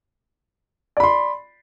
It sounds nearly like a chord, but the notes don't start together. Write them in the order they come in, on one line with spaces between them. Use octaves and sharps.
D5 B5 C6